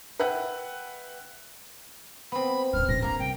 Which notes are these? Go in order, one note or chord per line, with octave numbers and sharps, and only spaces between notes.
B4 E5 F#5 G5 F#6
B3 C4 B5
D1 C#4 F6
A#1 A#6
A#3 D4 A#4 A#5
C2 G5